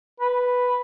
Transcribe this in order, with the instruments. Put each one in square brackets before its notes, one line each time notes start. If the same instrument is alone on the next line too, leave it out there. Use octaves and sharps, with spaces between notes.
[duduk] B4